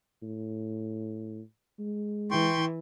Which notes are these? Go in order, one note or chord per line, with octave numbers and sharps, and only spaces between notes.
A2
G#3
E3 G5 C6 C#6